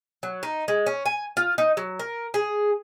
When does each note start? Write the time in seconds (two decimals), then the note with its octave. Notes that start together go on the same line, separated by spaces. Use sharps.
0.23 F#3
0.43 D#4
0.68 G#3
0.86 C#4
1.06 G#5
1.37 F4
1.58 D#4
1.77 F#3
1.99 A#4
2.34 G#4